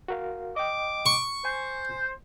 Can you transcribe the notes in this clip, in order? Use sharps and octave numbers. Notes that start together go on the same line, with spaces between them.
F#4 A#4 F5
D#5 G5 D6
C#6
C5 G#5